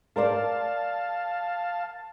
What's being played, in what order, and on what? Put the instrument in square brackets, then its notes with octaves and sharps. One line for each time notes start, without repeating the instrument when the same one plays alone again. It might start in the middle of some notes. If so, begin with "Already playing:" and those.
[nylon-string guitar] A#4 C5 D5 [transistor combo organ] F5 A5